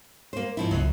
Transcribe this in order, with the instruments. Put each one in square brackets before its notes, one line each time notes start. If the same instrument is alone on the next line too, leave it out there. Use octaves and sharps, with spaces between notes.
[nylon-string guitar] A#3 C5
G#2 F3 E4
[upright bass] C#2 [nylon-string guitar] F#2 B2